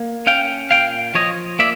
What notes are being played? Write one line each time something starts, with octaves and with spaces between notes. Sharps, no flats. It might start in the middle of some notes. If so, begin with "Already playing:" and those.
Already playing: A#3
C#4 F5 G5
A#2 F5 G5
F3 C#5 D#5
A#3 D5 E5